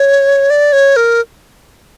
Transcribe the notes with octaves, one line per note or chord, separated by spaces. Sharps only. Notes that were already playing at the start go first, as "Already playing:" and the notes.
Already playing: C#5
D5
C#5
A#4